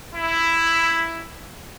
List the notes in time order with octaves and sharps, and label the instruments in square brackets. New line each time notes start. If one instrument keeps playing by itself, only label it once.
[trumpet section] E4